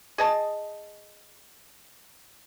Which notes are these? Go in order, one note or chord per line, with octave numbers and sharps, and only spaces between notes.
G#4 D#5 A5